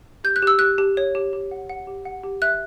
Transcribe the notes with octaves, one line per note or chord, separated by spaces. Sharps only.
G4 G6
F#6
G4 E6
G4 F#6
G4
C#5
G4
G4
F#5
F#5
G4
F#5
G4
E5 F#6